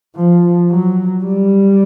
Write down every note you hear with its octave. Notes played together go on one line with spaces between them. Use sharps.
F3
F#3
G3